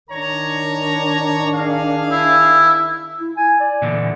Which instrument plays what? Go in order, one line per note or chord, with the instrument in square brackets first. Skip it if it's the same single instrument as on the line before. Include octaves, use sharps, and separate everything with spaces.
[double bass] D#3 D4 [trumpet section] C#5 A#5
[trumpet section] G#4 F5
[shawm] E4
[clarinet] E4
G#5
D5
[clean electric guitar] A#2 D3 E3